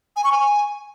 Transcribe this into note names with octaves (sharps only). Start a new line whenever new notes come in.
G#5
C#6
G#5